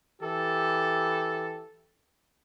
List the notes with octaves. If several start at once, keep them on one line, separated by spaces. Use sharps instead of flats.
E3 G4 A4